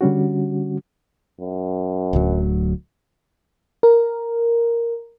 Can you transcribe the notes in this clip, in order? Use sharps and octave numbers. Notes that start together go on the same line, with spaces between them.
D3 G3 C#4 F#4
F#2
D1 D2 F#3
A#4